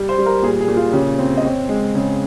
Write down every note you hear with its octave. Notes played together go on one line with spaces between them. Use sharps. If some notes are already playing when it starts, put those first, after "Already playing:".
Already playing: G3
C5
G3
A#4
A#2 G#4
G#4
A#2
F4
C#3 G4
C4
D#5
C4 C#5
G#3
C#3